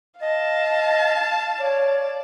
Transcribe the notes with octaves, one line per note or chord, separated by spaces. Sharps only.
D#5 F5 A5
C#5 D5